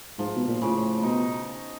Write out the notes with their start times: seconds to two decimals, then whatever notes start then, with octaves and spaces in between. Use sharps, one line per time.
0.19 G#2 F3
0.36 B2
0.48 A#2
0.62 A2 C#3
1.03 B2 D#4